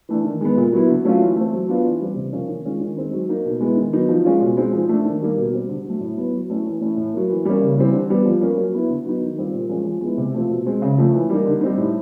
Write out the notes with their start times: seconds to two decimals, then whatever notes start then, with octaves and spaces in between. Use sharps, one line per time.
0.09 E3 A3 D4
0.25 D#3
0.41 G#3 B3
0.56 A#2
0.73 F#3 B3 E4
0.88 D3
1.05 F#3 A3 C#4 F4
1.21 E3
1.36 A3 C4
1.53 F#3
1.69 B3 D4 F4
1.84 E3
2.01 G3 C4
2.16 C3
2.33 F3 A#3 C#4 F4
2.49 D#3
2.65 G#3 C#4 F4
2.81 D#3
2.97 G#3 C4 D#4
3.13 F#3
3.29 A#3 D#4
3.46 B2
3.61 G#3 B3 E4
3.77 D#3
3.93 F#3 B3 D#4
4.09 F3
4.25 G#3 C#4 F4
4.42 B2
4.57 G#3 C4 D#4
4.73 F3
4.89 A3 D4
5.05 D#3
5.22 G3 A#3
5.37 B2
5.53 G3 C4
5.69 D3
5.85 F#3 A3
6.01 A2
6.17 F#3 B3 E4
6.33 F#3
6.50 A3 C#4 E4
6.66 E3
6.81 A3 C#4 E4
6.97 A2
7.13 F#3 A#3
7.29 E3
7.45 G3 A#3 C#4
7.61 C#3
7.77 E3 G3 C4
7.93 D3
8.10 G3 B3
8.26 F3
8.41 A#3 C#4
8.57 F#3
8.74 B3 E4
8.89 D3
9.05 F#3 B3 D#4
9.21 D#3
9.38 G3 C4 F4
9.54 A#2
9.69 F3 G#3 C#4
9.86 F3
10.01 G#3 B3 E4
10.18 C3
10.34 F3 A3 C4 F4
10.50 B2
10.66 G#3 C4
10.82 C#3
10.98 F3 A3 C#4
11.14 E3
11.29 G3 A#3 D#4
11.46 D3
11.61 G3 C4 D#4
11.78 A2